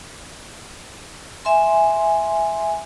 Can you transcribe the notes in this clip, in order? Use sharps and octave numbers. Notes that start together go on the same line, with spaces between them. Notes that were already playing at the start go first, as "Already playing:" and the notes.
E5 G#5 C6